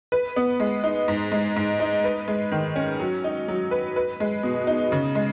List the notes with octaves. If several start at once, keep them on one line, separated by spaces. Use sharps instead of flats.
B4
B3
G#3
D#4
G#2
G#3
G#2
D#4
B4
G#3
D#3
C#4
F#3
D#4
F#3
B4
B4
G#3
B2
D#4
C#3
G#3